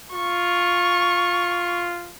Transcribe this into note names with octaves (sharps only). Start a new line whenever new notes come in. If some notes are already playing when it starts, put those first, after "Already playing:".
F4 C#6